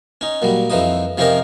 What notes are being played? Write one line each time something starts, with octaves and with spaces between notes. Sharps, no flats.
C#4 D#4
A#2 F#3 G3
F2 E3 F3 D#4 D#6
C3 F3 C#4 D#4 G4 A#4